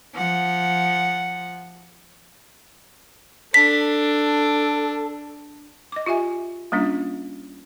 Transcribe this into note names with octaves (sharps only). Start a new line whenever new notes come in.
F3 F#5
D4 A4 B6
D#5 D6
F4 G4 E5 G#5
G3 A#3 C#4 D4 F4